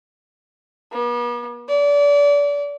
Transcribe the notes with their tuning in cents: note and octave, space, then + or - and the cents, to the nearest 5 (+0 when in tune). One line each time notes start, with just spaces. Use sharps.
B3 -45
D5 -30